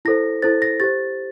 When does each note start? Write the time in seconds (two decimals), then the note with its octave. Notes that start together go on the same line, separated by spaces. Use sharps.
0.05 E4 A4 C5 A#6
0.42 E4 A4 C5 A6
0.62 A#6
0.80 G4 C5 A6